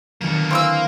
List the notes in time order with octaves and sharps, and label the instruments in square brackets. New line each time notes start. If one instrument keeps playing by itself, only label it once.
[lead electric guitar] B2 A#3 [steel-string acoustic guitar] D3 D#3 F#3
[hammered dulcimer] E3 F5 [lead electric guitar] A#3 [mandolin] C4 D6 E6